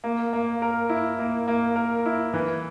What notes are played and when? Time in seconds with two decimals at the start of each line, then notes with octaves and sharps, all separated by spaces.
0.04 A#3
0.33 A#3
0.62 A#4
0.89 E4
1.19 A#3
1.48 A#3
1.76 A#4
2.06 E4
2.34 E3